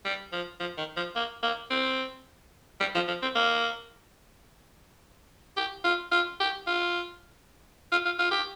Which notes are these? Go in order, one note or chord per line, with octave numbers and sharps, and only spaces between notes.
G3
F3
F3
D#3
F3
A#3
A#3
C4
G3
F3
F3
C4
A#3
G4
F4
F4
G4
F4
F4
F4
F4
G4